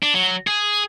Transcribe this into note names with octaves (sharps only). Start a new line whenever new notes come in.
D4
F#3
G#4